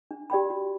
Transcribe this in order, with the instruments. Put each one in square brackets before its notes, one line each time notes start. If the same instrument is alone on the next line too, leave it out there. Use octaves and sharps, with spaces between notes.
[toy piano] D4
G4 D5 G5 B5
F#4